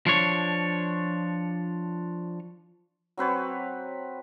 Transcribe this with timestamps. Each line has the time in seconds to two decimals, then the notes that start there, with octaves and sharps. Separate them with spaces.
0.07 F3 D4 C#5
3.17 F#3 C4 B4 C#5